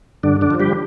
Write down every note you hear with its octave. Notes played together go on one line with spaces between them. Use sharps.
G2 D3 D4
D3 D4
F3
G3 G4